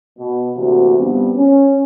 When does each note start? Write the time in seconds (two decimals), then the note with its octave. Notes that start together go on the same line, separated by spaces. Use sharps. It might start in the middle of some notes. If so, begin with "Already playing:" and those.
0.19 B2
0.57 D2 C3 E3 A#3 F#4
0.99 G2 F3 G3 B3 C4 D4
1.37 C#4